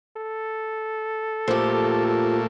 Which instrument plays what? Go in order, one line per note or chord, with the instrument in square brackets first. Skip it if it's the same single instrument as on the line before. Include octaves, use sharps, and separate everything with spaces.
[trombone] A4
[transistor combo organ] A#2 A3 [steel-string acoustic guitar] F3 G4